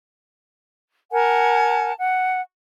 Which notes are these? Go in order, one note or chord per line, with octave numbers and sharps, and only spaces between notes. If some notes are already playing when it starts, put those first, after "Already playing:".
A#4 F#5 G#5 A5
F#5